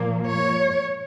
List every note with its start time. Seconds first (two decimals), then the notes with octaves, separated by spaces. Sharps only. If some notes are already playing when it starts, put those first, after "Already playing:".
Already playing: A#2 F3 A#3
0.27 C#5